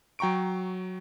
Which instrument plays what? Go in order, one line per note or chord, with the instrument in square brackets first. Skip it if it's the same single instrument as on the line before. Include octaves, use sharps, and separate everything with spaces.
[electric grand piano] F#3 G5 A#5 C#6 D7